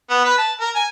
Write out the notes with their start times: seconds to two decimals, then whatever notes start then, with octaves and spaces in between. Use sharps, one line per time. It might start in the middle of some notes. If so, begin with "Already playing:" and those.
0.10 B3
0.25 B4
0.38 A5
0.61 A#4
0.76 G#5